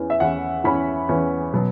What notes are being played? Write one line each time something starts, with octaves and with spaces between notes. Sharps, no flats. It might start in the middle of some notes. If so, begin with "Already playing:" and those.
Already playing: E2 E3 C#4
E5
E2 E3 C#4 F#5
E2 E3 C#4 B5
E2 E3 C#4
B2 F#3